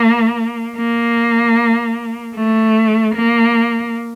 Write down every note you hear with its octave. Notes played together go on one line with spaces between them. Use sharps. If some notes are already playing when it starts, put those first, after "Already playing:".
Already playing: A#3
A#3
A3
A#3